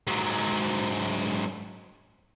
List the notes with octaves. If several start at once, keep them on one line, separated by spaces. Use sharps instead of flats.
G#2 F#3